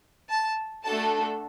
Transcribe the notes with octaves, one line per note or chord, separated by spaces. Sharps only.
A5
A3 D4 F#4 A4 A5